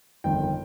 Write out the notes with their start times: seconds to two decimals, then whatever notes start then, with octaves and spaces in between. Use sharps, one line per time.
0.24 G1 F2 D#3 G5